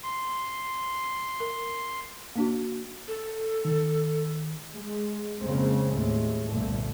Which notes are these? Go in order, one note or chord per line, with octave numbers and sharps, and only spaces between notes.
C6
A#4
A#3 D4 F#4
A4
D#3
G#3
F2 C#3 G#3 A#3 C4
D#2 A2 G#3
G1 C2 G2 A#2 D3 A3